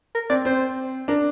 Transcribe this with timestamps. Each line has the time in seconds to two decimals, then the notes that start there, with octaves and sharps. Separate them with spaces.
0.15 A#4
0.30 C4 D5
0.45 C4 C5
1.08 D4 A#4